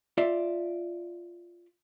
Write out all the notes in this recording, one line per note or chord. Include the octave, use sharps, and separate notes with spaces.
F4 D5 E5